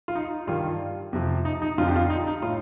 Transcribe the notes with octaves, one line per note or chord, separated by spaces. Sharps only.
F4
D#4
G2 D#3 G3 F4
F2 C3 F3
D#4
D#4
F2 D3 F3 F4
G4
F4
D#4
D#4
A2 F4